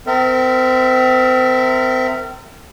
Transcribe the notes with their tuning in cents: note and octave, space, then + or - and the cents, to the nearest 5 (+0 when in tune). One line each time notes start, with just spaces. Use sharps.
C4 -30 A#4 -30 E5 +0